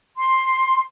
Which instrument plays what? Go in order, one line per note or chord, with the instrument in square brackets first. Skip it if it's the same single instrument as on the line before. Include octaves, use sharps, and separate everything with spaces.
[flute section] C6